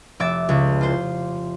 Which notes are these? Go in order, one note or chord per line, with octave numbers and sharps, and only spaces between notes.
F1 E5 D6 A6
C#2
F4 C5